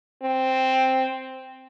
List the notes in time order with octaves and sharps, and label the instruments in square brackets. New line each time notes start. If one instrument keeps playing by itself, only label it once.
[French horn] C4